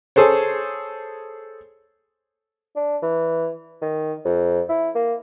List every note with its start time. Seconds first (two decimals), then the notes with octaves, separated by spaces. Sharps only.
0.16 G#4 A4 C5 C#5
2.76 D4
3.02 E3
3.82 D#3
4.25 F2
4.69 E4
4.95 A#3